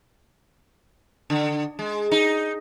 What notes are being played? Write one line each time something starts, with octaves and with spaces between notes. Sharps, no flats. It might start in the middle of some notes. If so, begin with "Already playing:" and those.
D3
G#3
D#4